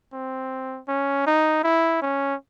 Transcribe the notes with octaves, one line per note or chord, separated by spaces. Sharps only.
C4
C#4
D#4
E4
C#4